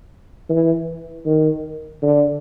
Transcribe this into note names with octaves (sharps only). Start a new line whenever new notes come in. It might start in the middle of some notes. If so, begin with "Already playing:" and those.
E3
D#3
D3